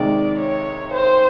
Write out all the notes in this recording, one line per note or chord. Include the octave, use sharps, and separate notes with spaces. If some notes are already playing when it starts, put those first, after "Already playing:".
Already playing: C3 D#3 G#3 D5
C#5
C5